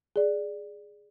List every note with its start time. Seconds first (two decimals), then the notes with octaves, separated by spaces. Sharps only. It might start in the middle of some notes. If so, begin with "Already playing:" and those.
0.16 G#4 D5